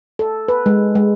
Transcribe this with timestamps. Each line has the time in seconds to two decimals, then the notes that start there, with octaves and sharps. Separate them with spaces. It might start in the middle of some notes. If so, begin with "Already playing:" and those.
0.19 A4
0.48 B4
0.66 G#3
0.95 G#3